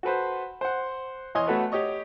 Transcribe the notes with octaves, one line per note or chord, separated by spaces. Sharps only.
F#4 A4 B4 C5
C5 F#5
E2 C#5 D#5 G#5 C6
A3 B3 F#4 A4 B4 C#5
G4 C#5 D#5 C#6